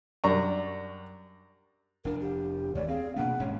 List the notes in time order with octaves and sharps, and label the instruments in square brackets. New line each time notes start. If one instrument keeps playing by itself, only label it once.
[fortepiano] F#2 G3 D4 A#5 C#6
[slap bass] F1 D4 [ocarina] A#4
[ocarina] G4
[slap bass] D#2 A3 [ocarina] C#5 [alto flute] D5
[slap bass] C4 [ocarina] G#4 [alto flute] F5
[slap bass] B2 A#3 B3 [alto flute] D4 [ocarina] F#5
[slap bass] D#1 G#2 C#4 [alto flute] C#5